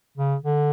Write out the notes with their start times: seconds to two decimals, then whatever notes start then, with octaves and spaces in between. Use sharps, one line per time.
0.18 C#3
0.43 D3